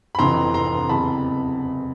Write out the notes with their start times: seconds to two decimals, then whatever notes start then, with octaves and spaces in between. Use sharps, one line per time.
0.15 B5
0.19 F1 F2 C3 E3 A#5 C6
0.54 A#5 C6
0.89 F#1 E2 C3 A5 B5